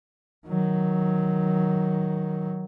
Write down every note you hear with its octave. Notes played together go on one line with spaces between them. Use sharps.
D#3 F#3